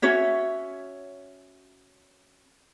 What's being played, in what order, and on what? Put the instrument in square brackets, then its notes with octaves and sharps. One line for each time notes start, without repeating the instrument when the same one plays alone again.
[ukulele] C#4 F#4 C#5 E5